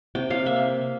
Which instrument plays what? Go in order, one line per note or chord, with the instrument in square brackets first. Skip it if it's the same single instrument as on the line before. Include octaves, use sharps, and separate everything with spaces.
[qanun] C3 G5
C3 F5
A#3 E5